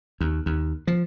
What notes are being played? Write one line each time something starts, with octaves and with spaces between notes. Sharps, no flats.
D#2
D#2
F3